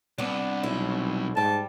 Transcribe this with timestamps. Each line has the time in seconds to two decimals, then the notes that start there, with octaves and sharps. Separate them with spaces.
0.18 C2 B3 D4
0.63 B1 E4
1.37 G#2 G3 A5